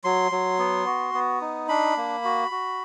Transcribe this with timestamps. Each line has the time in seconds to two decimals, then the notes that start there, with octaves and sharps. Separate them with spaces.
0.04 F#3 C6
0.32 F#3
0.59 B3
0.86 F#4
1.14 B3
1.41 D#4
1.68 D4 B5
1.97 A#3
2.24 F#4
2.51 F#4